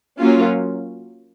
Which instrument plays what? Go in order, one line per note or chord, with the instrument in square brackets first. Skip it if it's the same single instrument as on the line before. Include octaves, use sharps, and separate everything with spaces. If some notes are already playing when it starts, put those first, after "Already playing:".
[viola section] F#3 A#3 C#4 F4